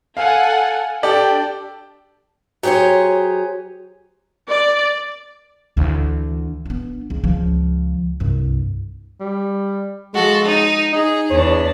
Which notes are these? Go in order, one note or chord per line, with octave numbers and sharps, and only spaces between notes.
A4 F5 F#5 G#5
D4 G4 A4 D5 G5
F#3 G4 G#4 C5 C#5
D5
D2 E3
B3 D4
C#2
C#2 F3
C2 G2
G3
F3 G#3 F#4 A4
D#4
D#4 G#4
E2 D4 C#5